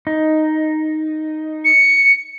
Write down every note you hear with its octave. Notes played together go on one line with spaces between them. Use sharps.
D#4
C#7